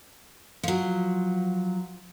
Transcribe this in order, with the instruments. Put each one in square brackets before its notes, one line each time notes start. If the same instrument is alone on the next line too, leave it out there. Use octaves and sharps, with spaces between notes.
[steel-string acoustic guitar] F3 F#3